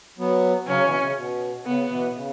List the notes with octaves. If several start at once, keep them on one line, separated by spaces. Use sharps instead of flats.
F#3 B3
C#3 F#3 C#4
B2 E3
C#3
B2
C#3 B3
B2 E3
C#3